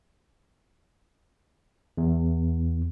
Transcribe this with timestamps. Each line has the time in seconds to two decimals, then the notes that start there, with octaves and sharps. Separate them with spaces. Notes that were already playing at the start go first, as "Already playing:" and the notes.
1.97 E2